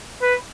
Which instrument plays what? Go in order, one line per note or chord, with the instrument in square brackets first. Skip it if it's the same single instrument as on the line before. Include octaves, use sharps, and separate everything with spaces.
[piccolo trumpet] B4